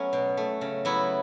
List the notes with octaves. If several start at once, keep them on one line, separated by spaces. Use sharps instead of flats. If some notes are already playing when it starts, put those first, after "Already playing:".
Already playing: F#3 A3 B3 C#4
B2
A3
C#3
F#3 B3 E4